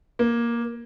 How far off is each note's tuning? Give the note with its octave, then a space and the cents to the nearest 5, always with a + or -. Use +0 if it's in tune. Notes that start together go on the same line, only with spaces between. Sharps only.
A#3 +10